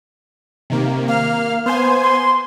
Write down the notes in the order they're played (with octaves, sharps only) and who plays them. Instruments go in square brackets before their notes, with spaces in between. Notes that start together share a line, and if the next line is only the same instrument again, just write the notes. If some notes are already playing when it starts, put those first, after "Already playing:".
[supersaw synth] C3 D#3 A#3
[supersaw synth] A#3 F6 [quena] F5
[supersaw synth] B3 C5 G#5 [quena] C6
[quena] C6